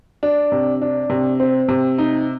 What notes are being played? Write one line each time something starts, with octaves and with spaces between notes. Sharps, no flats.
D4
C3
D4
C3
C4
C3
D#4